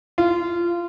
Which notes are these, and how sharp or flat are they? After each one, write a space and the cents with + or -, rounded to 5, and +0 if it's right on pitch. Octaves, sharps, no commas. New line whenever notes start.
F4 -20